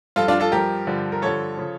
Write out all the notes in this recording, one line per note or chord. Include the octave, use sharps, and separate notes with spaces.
G2 F3 F4 A4
D4 F4
F4 A4
G2 F3 G4 A#4
G2 D3 F3
A#4
G2 D3 F3 A4 C#5
C#3 F3